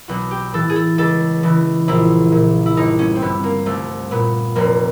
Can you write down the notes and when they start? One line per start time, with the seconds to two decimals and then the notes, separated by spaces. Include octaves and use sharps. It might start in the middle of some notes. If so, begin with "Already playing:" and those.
0.08 B1 F#4
0.31 G4
0.53 A2 E3 A4
0.69 G#4
0.76 A4
0.98 C#2 A4
1.43 C#3 E3
1.88 A#1 E4
2.32 A#2
2.66 E4
2.77 G1 D#4
2.99 C#4
3.16 C4
3.22 G2 D3 B3
3.44 A#3
3.66 C2 A3
4.11 A#2 B3
4.55 F1 A#3